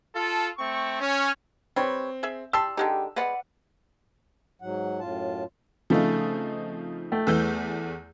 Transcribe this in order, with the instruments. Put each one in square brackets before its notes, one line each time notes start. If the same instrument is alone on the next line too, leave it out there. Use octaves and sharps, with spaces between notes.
[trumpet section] F4 A4
A3 C4 C#6
C#4
[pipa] G3 B4 C#5 [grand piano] C4
[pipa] G#4 E5
[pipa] G4 A5 C6 [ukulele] D5 [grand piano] E6
[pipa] D3 G#3 D#4 [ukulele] G4 B4
[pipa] G#3 B3 [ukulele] B4 D5 F#5
[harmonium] G#2 F#3 F#5
F#2 A2 F4 A5
[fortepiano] C#3 A3 F5 [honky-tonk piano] F3 C4 D#4
[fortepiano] A3 G5
[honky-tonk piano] E2 A3 G6 [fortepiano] E3 E6